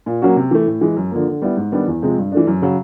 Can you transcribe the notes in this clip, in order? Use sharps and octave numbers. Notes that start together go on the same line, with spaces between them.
A#2
F#3 A#3 C#4 F#4
C3
E3 A3
A2
E3 G#3
F#2
D3 F3 A#3
D3
G3 B3 E4
G#2
D#3 G3 B3 D4
E2
C3 F3 G#3 C4
G2
E3 A3 D4
F#2
C#3 F#3